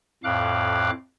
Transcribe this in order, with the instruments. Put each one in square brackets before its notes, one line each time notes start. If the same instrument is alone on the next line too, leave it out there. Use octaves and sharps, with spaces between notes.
[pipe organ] F2 A2 F5 D6 F#6